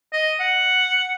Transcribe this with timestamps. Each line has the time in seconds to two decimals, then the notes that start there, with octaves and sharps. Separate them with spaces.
0.13 D#5
0.40 F#5